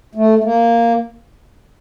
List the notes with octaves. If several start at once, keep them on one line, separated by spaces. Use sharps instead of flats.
A3
A3
A#3